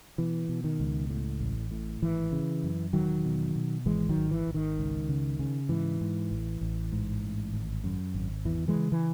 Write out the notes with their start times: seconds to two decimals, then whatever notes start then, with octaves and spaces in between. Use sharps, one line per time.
0.18 B2 E3
0.49 B2
0.64 D#3
0.80 C#2
1.10 A2
1.41 A1
1.71 A2
2.02 G#1 E3
2.32 C#3
2.63 F#2
2.93 E1 D#3 F#3
3.25 B2
3.56 B2
3.86 G#1 E3 G#3
4.09 D#3 F#3
4.16 G#1
4.31 E3
4.47 G#1
4.54 D#3
4.78 C#2
5.09 C#3
5.39 C#3
5.69 G#2 E3
6.01 G#2
6.31 A1
6.61 A1
6.92 G#2
7.24 A1
7.53 G#1
7.84 F#2
8.14 G#1
8.45 E2 E3
8.68 E3 G#3
8.76 C#3
8.92 E3